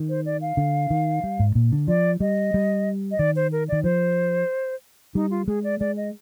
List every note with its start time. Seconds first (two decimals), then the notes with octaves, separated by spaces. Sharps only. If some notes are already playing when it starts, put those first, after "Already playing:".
Already playing: D#3
0.09 C5
0.26 D5
0.41 F5
0.57 D3
0.90 D#3
1.24 G3
1.39 G#2
1.55 A#2
1.72 D3
1.88 F3 D5
2.20 G3 D#5
2.54 G3
3.11 D#5
3.19 D#3 D5
3.36 C5
3.52 A#4
3.68 D#3 D5
3.84 F3 C5
5.15 G3 D#4
5.31 F4
5.48 G#3 G#4
5.64 D5
5.80 G#3 D5
5.97 D#5